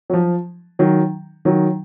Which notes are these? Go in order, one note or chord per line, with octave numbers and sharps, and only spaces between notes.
F#3
F3
D#3 F#3
D#3 F#3